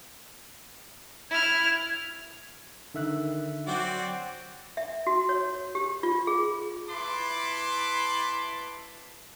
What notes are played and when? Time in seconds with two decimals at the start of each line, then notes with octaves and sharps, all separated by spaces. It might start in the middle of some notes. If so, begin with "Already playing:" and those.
1.31 E4 F6 G#6
2.94 D3 D#3 E5 F#6
3.67 F#3 C4 F#4 D5
4.77 E5
5.07 F#4
5.29 C#5
5.75 G4
6.03 F4
6.27 G#4
6.90 E4 B4 A5 B5 C6 D6